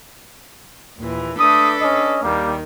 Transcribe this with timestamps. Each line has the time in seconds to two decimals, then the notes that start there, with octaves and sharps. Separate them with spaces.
0.98 D#2 A#2 E3
1.39 A3 D4 A4 B4 D#6
1.80 C#4 D#5
2.22 D#2 D#3 G3 A#3